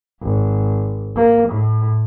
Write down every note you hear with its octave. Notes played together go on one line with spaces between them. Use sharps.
G#1
A#3
A2